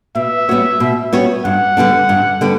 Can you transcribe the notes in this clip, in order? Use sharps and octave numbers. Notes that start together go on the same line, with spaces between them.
B2 E5
G3 B3 F#4 C#5
B2
G3 B3 F#4 C#5
G2 F#5
D3 G3 B3 D4
G2
D3 G3 B3 D4